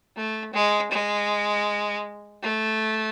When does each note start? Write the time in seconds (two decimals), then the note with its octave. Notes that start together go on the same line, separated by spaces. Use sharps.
0.16 A3
0.53 G#3
0.91 G#3
2.43 A3